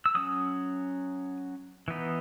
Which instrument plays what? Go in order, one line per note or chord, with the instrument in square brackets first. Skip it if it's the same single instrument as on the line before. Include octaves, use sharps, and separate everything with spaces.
[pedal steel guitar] E6
F#3 C#4 D#6
E3 B3 D#4